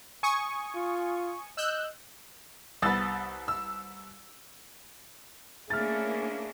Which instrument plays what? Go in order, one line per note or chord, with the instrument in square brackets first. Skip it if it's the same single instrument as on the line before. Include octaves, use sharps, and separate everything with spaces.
[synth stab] G#5 C#6 D#6
[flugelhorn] F4
[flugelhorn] D#5 [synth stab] E6 F#6 G6
[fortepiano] C2 B3 [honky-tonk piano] D#6 E6 A6
[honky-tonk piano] E6
[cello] A3 E4 [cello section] A#3 C#4 D4 [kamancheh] G#4 [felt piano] F6 A6